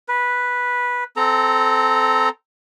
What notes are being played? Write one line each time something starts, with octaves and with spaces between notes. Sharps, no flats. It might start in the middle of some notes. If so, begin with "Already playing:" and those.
B4
C4 A4 A#5